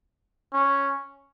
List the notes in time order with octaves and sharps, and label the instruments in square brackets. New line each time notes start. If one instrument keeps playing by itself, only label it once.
[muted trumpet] C#4